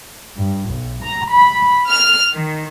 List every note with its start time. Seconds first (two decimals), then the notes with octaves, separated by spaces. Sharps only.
0.41 G2
0.73 B1
1.04 A#5
1.34 B5
1.90 F6
2.31 D#3